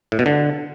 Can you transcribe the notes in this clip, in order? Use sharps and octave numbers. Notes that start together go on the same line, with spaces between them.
A2
B2
D3